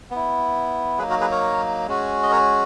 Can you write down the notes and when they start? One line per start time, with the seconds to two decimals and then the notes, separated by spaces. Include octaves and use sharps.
0.11 B3 E4
0.98 F#3 A#3 D#4 G#4 B4
1.10 F#4 A#4
1.21 G#4 B4
1.31 A#4 C#5
1.87 G#3 C#4 F#4
2.23 D#5
2.31 A#4 C#5